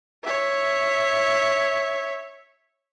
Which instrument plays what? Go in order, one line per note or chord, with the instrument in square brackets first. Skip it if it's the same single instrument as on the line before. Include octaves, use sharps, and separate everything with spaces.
[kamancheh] C#5 E5